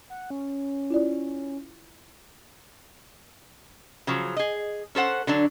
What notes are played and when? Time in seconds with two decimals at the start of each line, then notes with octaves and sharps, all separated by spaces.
0.10 F#5
0.30 C#4
0.90 E4 F4 D5
4.07 C#3 F3 F#3
4.37 G#4 D#5
4.95 C#4 A4 C5 F#5
5.27 D3 F#3 D4